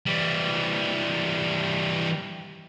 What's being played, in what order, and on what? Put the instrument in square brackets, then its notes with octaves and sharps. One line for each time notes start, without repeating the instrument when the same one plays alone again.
[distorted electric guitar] E3 G3